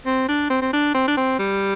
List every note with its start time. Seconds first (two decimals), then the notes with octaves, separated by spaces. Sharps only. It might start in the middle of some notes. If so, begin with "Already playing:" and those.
0.06 C4
0.28 D4
0.50 C4
0.61 C4
0.73 D4
0.94 C4
1.07 D4
1.17 C4
1.39 G3